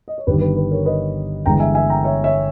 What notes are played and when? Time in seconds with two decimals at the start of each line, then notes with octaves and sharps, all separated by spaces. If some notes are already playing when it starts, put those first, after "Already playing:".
0.08 D#5
0.18 C#5
0.27 G1 G2 D#3 G3 B4
0.41 B4
0.56 B4
0.71 A#4 C#5
0.85 B4 D#5
1.45 G1 G2 E3 G#3 G5 A#5
1.60 E5 G#5
1.75 E5 G#5
1.90 G5 A#5
2.04 C#5 E5
2.24 C#5 E5